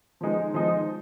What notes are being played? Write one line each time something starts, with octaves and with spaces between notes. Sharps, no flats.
F3 G#3 D#4
F3 G#3 D#4